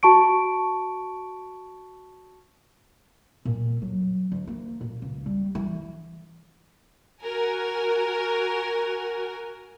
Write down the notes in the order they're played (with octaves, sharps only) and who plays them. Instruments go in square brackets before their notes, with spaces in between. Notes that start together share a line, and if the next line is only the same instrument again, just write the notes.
[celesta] F#4 A5 C#6 D7
[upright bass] A#2
F#3
D2
A#3
A#2
C#2
G3
E3
[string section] F#4 A#4 G#5